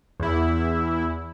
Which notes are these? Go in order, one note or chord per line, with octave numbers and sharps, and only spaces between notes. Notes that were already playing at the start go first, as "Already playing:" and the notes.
E2 E4